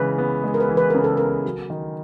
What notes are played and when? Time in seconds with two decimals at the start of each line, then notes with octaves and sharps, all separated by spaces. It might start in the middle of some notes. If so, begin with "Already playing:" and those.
Already playing: C#3 E3 G#3 B4
0.18 B3
0.44 G#3
0.54 A#4
0.60 B4
0.69 E3
0.77 B4
0.90 C#3 A#4
1.04 A4
1.17 B3 A#4
1.45 F#3
1.70 D#3